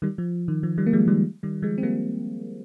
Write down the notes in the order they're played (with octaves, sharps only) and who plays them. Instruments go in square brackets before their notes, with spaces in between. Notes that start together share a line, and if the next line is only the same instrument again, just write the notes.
[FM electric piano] D#3 G3
F3
D#3
F3
D#3 G3
A#3
F3 G#3
D#3 G3
D#3 G3
F3 G#3
C4
G3 A#3